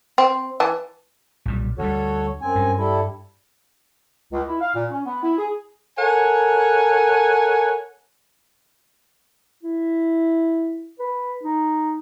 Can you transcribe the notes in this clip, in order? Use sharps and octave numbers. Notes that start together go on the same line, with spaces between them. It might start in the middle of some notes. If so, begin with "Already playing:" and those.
C4
E3 A5
B1 A#2 G3
D2 G3 F#4 A4 C#5
F#2 C4 G#5
G2
G3 E4 A4
C#2
E4
F5
A#2
C#4
B3
E4
G#4
A4 A#4 C#5 F#5 G#5
E4
B4
D#4